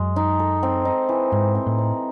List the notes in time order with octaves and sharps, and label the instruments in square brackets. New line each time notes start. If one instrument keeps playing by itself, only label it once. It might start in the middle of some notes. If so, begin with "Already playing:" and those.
Already playing: [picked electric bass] F#2 [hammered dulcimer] G#3
[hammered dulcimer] D#4
A4
C4
D#4
E3
[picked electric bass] G#2 [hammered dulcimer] C4
[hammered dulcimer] C4
[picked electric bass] A2
[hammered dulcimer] C4